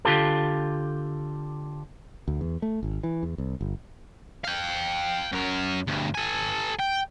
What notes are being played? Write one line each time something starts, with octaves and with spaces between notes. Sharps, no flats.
D3 F4 G4 A4
D2
E2
A3
G#1
E3
E2
C2
G1
F5 G5
F#2 A#4
D2 G2
A4 G#5
G5